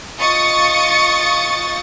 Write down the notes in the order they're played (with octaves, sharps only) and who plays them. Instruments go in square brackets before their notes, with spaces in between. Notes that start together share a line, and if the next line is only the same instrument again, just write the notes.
[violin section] F4 D#5 C#6 D#6 A6 C#7